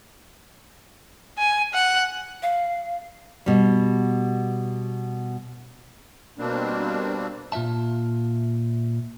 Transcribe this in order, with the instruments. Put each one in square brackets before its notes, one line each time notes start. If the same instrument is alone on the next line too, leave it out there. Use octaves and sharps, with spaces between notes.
[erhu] G#5
F#5
[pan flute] F5
[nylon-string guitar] B2 G3
[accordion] B2 G3 A#3 C4 D4
[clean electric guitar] A#2 F4 D#5 E5 A5